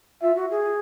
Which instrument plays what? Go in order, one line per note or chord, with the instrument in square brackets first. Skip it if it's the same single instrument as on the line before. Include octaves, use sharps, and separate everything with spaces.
[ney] F4 [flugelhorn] E5
[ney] F#4
G#4